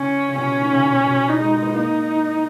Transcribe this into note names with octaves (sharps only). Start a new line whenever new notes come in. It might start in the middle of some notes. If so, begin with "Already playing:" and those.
Already playing: C#3 C#4
C#3
B2 C#4
D#3
C#3
B2
B2
D#4
G#3
G#3
B3
A#3 D#4